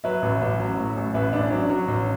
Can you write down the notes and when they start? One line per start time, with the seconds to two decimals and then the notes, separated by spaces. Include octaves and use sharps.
0.04 F#3 B4 E5
0.22 A1
0.41 A1
0.60 F#3
0.78 A2
0.96 A1
1.14 A1 B4 E5
1.33 A1 D4
1.51 F#3 D4
1.69 F#3
1.88 A1